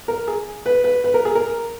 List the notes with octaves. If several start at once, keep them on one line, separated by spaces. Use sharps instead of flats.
A#4
G#4
B4
B4
B4
A#4
G#4
A#4